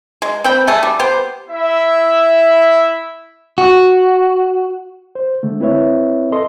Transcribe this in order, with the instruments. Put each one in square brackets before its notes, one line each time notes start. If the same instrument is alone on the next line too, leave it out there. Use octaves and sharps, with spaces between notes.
[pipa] G#3
C4 G5 B5
G3 A3 G#4
G3
B3 G4 C5
[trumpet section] E4 E5
[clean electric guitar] F#4
[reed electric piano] C5
D3 G#3 A3
C4 E4 B4 C#5 E5
A4 D#5 C6